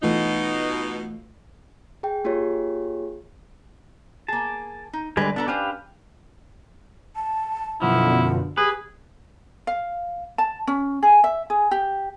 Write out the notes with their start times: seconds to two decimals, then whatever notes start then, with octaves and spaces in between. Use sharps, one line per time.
0.03 B2 E3 A3 D#4 F4
2.03 G#4 G5
2.24 A#3 F4 G4 G#4 C#5
4.28 A#3 G#4 A5
4.93 D#4
5.17 D3 G3 G#3 B4 D5
5.36 B3 D4 A4 A#5
5.48 C#4 D4 G4 B4 C5 F5
7.16 A5
7.82 F#2 B2 D3 F3 E4 F#5
8.57 G4 G#4 B4
9.67 F5
10.38 A5
10.67 C#4
11.03 G#4
11.24 E5
11.50 G#4
11.71 G4